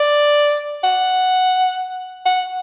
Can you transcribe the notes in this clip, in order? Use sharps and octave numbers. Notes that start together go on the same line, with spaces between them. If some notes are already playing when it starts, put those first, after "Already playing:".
Already playing: D5
F#5
F#5